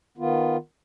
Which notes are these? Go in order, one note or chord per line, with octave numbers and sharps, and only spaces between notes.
D#3 B3 F4